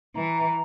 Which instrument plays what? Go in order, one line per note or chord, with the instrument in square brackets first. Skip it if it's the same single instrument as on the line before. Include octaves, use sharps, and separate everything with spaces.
[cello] E3 [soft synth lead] A#5